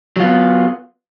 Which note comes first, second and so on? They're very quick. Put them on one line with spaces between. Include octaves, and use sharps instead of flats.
F#3 F4 B3